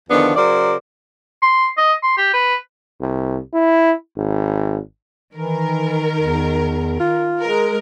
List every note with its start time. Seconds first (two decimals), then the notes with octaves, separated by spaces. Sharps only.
0.10 E2 D3 D#3 F3 B3 D4
0.35 C#3 F#3 A#4 C5 D5
1.42 C6
1.78 D#5
2.03 C6
2.17 G4
2.34 B4
3.01 C2
3.54 E4
4.17 G#1
5.35 D#3 E3 A#4
6.21 E2
7.00 F4
7.41 G#3 A#4